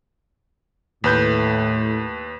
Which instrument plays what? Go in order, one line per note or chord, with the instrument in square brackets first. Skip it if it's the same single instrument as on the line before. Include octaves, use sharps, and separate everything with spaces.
[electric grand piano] D#2 B4 G6 [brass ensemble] A2